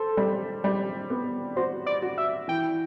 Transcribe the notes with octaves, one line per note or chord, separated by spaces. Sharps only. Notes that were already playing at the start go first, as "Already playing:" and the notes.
Already playing: A4 C5
G3
G3
B3
F#4 C5
D5
F#4
E5
E3 G5